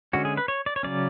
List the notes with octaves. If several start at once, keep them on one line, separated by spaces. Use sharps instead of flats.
D3 G#3 C#4 F#4
G#4
B4
C#5
D5
C#5
C#3 F#3 C#4 D5